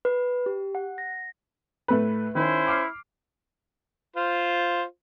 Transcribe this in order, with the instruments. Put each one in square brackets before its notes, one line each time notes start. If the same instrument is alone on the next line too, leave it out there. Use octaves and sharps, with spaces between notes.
[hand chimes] B4
G4
F#5
A#6
[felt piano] A2 A3 B4
[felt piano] D#3 [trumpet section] C#4 E4 C5
[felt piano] D6 F6 C7
[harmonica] F4 C5